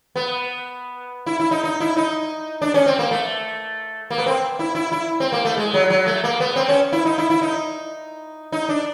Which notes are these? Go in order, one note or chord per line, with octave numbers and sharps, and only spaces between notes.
B3
E4
E4
D#4
D#4
E4
D#4
D4
C#4
C4
A#3
A3
A#3
B3
C4
E4
E4
E4
C4
A#3
A3
G#3
F#3
F#3
A3
A#3
B3
C4
C#4
E4
D#4
E4
E4
D#4
D#4
D4